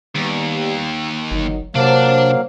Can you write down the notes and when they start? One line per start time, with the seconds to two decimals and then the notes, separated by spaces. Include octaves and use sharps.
0.16 D#2 G3 B3 G4
1.31 G1 D#3 F#3
1.75 C3 F#3 A#3 D4 C5 F5 A5